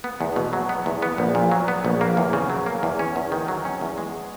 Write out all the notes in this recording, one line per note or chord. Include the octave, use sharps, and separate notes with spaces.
B3
E2
B2
F#3
B3
E2
B3
A#1
A#2
F#3
B3
A#1
A#3
E2
C#3
F#3
A#3
E2
C#4
E2
D#3
F#3
C#4
E2
G#3